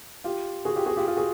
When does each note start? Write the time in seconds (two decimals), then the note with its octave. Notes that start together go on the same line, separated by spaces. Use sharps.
0.24 F4 G4
0.65 F#4 G#4
0.76 F4 G4
0.86 F#4 G#4
0.96 F4 G4
1.06 F4 G4
1.17 F#4 G#4